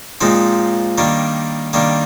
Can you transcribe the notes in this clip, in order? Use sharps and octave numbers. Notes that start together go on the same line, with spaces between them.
A#2 F3 G#3 C4 D#4
D#3 G3 A#3 D4
D#3 G3 A#3 D4